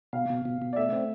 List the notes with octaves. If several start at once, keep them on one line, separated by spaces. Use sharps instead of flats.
B2 F5
B2
B2
B2
D5
A3 E5
C4